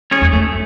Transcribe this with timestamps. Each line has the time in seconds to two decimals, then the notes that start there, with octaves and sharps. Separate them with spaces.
0.11 C#4 G#4 C#5
0.21 F2
0.33 F#2 A3